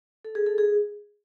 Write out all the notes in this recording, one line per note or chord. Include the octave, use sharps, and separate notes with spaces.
A4
G#4
A4
G#4